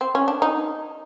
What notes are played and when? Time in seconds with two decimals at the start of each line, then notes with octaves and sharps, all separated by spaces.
0.01 C4
0.15 C#4
0.28 D4
0.42 D#4